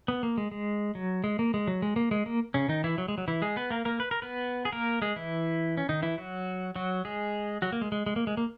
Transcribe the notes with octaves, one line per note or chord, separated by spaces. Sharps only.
B3
A#3
G#3
G#3
F#3
G#3
A#3
G#3
F#3
G#3
A#3
G#3
A#3
C#3 C#4
D#3 D#4
E3 E4
F#3
G#3
F#3
E3 E4
G#3 G#4
B3 B4
A#3 A#4
A#3 A#4
B4
A#4
B3 B4
G#4
A#3 A#4
G#3 G#4
E3 E4
C#4
D#3 D#4
E3 E4
F#3 F#4
F#3 F#4
G#3 G#4
F#3 F#4
A#3
G#3
G#3
G#3
A#3
G#3
A#3